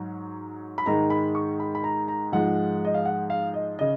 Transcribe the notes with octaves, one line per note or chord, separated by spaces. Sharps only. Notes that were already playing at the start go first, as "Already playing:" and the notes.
Already playing: G#2 F#3
B5
G#2 D#3 G#3 A#5
B5
C#6
B5
B5
A#5
A#5
G#2 F3 G#3 F#5
D#5
F5
F#5
F5
D#5
C#3 D#5